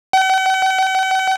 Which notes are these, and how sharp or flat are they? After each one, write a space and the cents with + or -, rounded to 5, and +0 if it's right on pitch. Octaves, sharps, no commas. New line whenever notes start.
F#5 +45